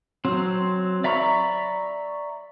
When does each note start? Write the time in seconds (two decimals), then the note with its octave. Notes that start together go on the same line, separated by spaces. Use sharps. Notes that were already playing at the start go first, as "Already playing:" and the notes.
0.25 F#3 C4
1.04 D5 E5 A#5 B5 C#6